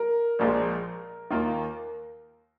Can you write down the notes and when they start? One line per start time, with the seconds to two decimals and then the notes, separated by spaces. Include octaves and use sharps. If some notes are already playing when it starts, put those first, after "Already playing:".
Already playing: A#4
0.39 A#1 A#2 F3 G#3
1.31 D#2 D#3 A#3 F4